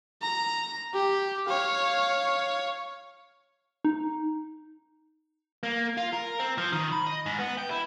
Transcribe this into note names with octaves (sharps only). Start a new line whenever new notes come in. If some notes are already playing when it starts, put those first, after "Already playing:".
A#5
G4
C#5 F5
D#4
A#3
F4
A#4
C4
F3
D#3
B5
D#5
G#2
B3
G5
E4